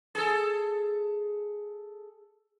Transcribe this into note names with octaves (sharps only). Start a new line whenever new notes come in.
G#4 A4